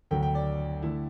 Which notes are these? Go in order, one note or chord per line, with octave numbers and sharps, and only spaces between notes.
D2 D3 F#3 G5
G5
D5
D3 A3 E4